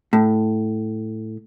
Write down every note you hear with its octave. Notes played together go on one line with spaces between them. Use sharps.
A2